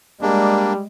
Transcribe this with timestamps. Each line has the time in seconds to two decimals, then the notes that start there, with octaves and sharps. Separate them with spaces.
0.22 G3 G#3 A#3 D4